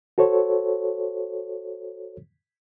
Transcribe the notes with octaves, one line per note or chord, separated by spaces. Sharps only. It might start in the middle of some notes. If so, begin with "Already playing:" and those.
F#4 A4 C5 C#5